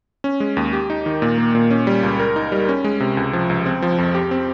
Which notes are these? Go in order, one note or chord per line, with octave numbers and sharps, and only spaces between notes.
C#4
G#3
D#2
G4
D#4
D#3
A#2
A#3
A#2
C#4
G3
C#2
A#4
D#4
G3
C#4
G#3
C3
C#2
F3
C#2
C4
F3
F2
G4
C4